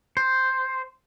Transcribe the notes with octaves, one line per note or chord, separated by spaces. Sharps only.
C5